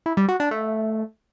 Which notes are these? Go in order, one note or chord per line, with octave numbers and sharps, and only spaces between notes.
E4
G3
F#4
D4
A3